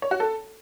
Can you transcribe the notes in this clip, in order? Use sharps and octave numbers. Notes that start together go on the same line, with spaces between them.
C#5
F#4
A4